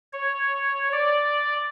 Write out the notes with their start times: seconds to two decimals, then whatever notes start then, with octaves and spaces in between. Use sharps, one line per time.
0.13 C#5
0.92 D5